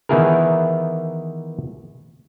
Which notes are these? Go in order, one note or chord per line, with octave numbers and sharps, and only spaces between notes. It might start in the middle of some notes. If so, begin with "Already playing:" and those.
D#3 E3 B3 E4 G#4 A#4